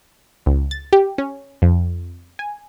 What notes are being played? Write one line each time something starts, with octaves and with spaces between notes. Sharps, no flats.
C#2
A6
G4
C#4
F2
G#5